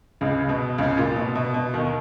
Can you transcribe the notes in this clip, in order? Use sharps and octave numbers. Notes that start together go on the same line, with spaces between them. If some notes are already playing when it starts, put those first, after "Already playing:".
C#2 C#3
B2
C#2 C#3
A#2
B2
B2
B2
D#2 D#3